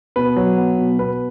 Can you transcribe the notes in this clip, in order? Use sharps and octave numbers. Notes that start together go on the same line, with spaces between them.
B2 B4
F#3
B3
B2
B2 B4